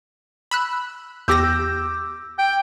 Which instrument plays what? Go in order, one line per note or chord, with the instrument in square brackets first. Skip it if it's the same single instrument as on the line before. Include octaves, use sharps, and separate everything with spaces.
[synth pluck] B5 E6 F#6
[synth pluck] E2 G4 A#6 [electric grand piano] D6 E6 G6
[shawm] G5